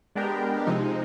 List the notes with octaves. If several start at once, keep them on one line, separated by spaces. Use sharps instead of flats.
G#3 B3 D4 G4 A#4
C3 F3 G#3 C4 D#4